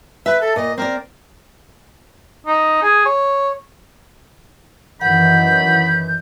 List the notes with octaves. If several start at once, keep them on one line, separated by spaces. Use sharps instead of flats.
B4 E5
A4
A#2 D#5
C4 A#4 D5
D#4
G#4
C#5
F#2 D#3 E3 F#5 B5 G6